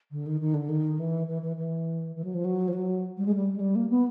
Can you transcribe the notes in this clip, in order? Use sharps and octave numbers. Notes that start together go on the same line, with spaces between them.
D3
D#3
D#3
D3
D#3
E3
E3
E3
E3
E3
F#3
F3
F#3
F3
F#3
G3
G#3
G3
G#3
G3
A#3
B3